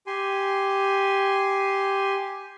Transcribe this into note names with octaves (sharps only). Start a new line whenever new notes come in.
G4 G#5 C6